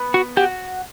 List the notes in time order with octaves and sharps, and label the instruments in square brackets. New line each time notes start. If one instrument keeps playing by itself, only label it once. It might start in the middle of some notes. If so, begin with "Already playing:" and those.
Already playing: [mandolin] B3
[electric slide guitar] F#4
[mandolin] F#4 [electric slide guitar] G4